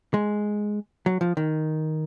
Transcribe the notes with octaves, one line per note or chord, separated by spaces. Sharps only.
G#3
F#3
F3
D#3